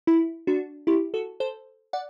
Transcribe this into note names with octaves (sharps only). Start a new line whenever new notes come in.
E4
D4 F#4
E4 G4
F#4 A4
A4 C5
D5 F#5